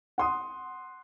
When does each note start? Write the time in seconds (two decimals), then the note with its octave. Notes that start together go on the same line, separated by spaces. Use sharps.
0.18 F#5 C6 D#6